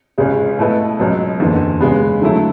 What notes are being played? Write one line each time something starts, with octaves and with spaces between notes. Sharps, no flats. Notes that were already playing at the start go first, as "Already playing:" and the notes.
C#2 C#3 G#3
B2 A3 E4 B4
C#2 B2 F#3
F#1 E2 D3
C#3 G#3 B3
D3 F#3 A3 E4